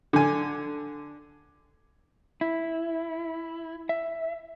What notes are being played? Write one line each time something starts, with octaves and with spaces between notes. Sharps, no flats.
D3 G#5
E4
E5